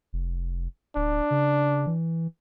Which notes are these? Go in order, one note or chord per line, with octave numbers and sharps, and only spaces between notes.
F1
D1 D4
C#3
E3